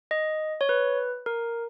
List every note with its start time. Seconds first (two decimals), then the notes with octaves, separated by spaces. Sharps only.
0.11 D#5
0.61 C#5
0.69 B4
1.26 A#4